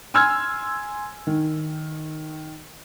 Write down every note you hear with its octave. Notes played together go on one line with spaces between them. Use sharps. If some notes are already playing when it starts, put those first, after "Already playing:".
G#5 C6 E6 F6 G#6
D#3